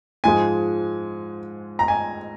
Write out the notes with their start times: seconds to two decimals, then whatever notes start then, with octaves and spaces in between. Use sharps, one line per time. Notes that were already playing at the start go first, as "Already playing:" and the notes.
0.24 G#2 F3 G#3 G#5
1.79 A#5
1.88 G#5